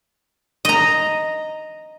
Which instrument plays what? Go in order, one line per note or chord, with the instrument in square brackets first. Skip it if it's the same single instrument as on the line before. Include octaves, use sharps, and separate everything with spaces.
[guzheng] D#5 A#5